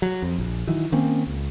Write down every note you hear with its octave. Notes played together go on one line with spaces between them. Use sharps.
F#3
F2
A#1
D#3 E3 F#3
D#3 A#3 C4 C#4
C#2